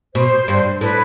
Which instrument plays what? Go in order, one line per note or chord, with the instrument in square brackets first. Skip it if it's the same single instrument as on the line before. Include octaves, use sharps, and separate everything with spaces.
[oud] B2 [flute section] C5
[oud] G2
[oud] A2 [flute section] B4